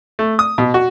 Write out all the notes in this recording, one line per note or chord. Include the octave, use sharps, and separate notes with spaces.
A3
D#6
B2
F#4